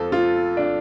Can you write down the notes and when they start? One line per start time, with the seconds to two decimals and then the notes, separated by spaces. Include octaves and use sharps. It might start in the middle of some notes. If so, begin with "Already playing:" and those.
Already playing: F2 F3 C4 A4
0.12 F4
0.57 D4